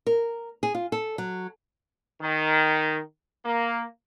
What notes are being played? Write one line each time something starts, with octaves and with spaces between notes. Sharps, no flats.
A#4
G#4
F4
A4
F#3
D#3
A#3